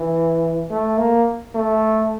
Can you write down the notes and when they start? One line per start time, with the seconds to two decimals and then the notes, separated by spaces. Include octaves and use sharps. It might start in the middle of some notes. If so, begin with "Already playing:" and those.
Already playing: E3
0.70 A3
0.98 A#3
1.55 A3